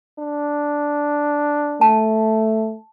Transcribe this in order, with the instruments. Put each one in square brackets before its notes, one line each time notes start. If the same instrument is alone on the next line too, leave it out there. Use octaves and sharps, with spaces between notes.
[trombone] D4
[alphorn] A3 [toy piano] A5